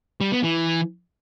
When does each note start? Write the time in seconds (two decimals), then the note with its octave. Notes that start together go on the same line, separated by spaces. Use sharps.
0.21 G3
0.32 B3
0.43 E3